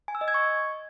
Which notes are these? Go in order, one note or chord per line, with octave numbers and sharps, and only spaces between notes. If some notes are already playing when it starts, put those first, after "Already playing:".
G#5
E6
D#5
G#6
C#6